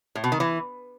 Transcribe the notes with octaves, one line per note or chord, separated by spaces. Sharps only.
A2
B2
D#3
E3